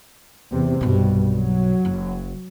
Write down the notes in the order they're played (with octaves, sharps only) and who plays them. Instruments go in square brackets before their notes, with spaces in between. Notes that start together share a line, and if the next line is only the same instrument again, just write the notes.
[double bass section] E2 C3
[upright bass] B1 B2 [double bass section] G2
[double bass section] F#3
[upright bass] F#1